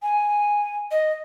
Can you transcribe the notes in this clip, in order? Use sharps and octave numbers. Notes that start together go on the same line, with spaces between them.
G#5
D#5